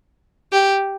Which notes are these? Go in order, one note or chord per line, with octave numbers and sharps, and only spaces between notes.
G4